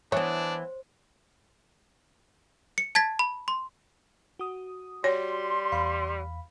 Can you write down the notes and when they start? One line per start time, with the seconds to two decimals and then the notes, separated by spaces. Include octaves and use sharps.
0.12 E3 B3 D4 C5 C#5
2.78 C#7
2.95 A5 G#6 A6 B6
3.19 B5
3.48 C6
4.39 F#4 D#6
5.04 G3 F#4 C#5 C6
5.72 E2 F5 B5